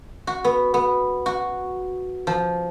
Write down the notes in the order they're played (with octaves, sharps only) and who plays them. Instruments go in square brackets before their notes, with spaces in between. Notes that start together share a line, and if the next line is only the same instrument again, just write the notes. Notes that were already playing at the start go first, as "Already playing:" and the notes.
[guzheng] F#4
B3
B3
F#4
F3